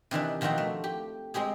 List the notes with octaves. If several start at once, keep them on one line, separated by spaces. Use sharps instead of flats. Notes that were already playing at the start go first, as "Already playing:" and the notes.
C3 D#3 E3 D4
B2 D#3 F3 C4 F#4 G4
A3
G4
G#3 C4 G4 G#4